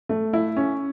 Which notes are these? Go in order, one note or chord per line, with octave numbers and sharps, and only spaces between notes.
A3
E4
C#4